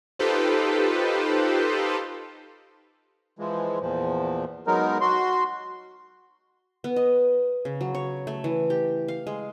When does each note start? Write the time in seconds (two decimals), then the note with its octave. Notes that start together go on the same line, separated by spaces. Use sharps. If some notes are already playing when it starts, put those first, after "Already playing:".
0.19 D#4 F4 G4 A4 B4 C5
3.39 E3 F3 G#3
3.81 E2 A#2 F3
4.67 F#3 G#3 B3 D#4 A#4
5.01 F#4 C6
6.84 B3
6.96 D#5
7.65 C#3
7.81 F#3
7.95 C#5
8.27 A3
8.44 E3
8.70 G4
9.08 F5
9.27 G#3